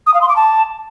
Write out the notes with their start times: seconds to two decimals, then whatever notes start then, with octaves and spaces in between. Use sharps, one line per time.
0.06 D#6
0.14 F5
0.21 C6
0.29 D6
0.36 A5